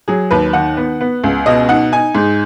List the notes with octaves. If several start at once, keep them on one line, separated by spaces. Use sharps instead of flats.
F#3 G#4
D#2 B4
D#3 F#5
B3
B3
C#2
B2 D#5
D#4 F#5
D#4 G#5
G#2